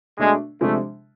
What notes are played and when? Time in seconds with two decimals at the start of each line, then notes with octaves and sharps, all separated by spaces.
0.18 B2 G#3 A3 D4
0.61 C3 F3 G#3 A3 D4